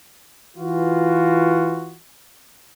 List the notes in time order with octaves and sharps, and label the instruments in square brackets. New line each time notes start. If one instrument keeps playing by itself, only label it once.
[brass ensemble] E3 F4 F#4